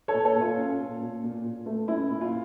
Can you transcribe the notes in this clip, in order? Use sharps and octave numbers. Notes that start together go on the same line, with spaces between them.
A4 C#5
A#2
A4 C#5
A#2
F4
C#4
A#2
A#2
A#2
A#2
A3
C#4 E4
A#2
F4